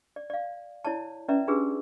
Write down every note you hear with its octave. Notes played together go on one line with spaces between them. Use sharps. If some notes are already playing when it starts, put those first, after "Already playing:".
D5
D5 F5
E4 C#5 D5 A5
C#4 B4 D5 E5 A#5
D4 F4 G4 G#4 B4 E6